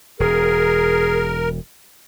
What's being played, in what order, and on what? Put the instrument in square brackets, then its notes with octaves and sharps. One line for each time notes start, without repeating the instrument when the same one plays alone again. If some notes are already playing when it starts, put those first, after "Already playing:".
[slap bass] E1 [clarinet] G#4 [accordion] A#4